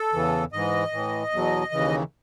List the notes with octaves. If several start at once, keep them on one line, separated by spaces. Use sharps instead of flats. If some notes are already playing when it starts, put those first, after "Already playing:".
Already playing: A4
E2 C#3 E3
G#2 E3 D#5
A2 E3
E2 B2 F#3
D#2 C#3 E3